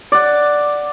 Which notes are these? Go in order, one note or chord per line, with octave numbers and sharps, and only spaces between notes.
D5 F#5